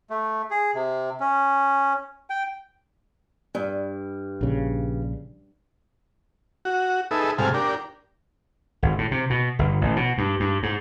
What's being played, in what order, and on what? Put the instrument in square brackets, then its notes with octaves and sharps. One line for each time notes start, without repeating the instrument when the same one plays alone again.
[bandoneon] A3
G#4
C3
C#4
G5
[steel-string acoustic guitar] G2
[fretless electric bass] A#1 C#3
[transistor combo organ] F#4
D#4 G#4 A4 B4 E5
G#2 C3 G3 A4 F5 G#5
D4 G4 A#4
[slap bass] G#1
A2
C3
B2
G1
A1
B2
G2
G2
G#2